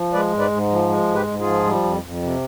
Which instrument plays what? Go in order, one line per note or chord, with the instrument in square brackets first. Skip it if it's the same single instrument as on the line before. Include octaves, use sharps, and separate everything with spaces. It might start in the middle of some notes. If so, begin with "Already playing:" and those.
Already playing: [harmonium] F3
G#3 B4 D5
G#2
B4 D5
G#2
F3
G#3
G#2
G4 B4
G#2
F4 G#4
F3
G3
F2
F2
C3